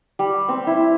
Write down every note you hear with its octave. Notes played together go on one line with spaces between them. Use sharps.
G3
C4
E4